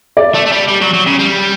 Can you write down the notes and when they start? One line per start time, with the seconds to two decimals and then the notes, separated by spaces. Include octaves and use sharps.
0.17 D5
0.34 A3
0.46 A3
0.52 G3
0.68 G3
0.81 F#3
0.94 F#3
1.07 C#3
1.19 G3